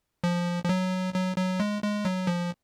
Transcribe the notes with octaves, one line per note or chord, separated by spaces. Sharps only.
F3
F3
F#3
F#3
F#3
G#3
G#3
F#3
F3